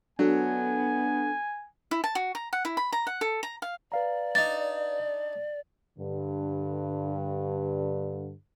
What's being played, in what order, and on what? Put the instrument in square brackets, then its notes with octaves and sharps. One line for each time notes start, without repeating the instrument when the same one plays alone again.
[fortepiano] F#3 [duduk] B3 [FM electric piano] D4 A4 [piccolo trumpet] G#5
[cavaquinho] E4
A5
F#4
A#5
F#5
E4
B5
A#5
F#5
A4
A#5
F5
[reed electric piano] B4 F5 A#5 [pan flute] D5
[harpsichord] D4 D#4 [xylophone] A6
[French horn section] G2 D3